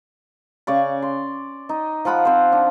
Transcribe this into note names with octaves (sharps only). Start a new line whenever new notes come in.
C#3 D5 C#6
C6
D#4
F3 F4 F#5 B5
C4 C5
D4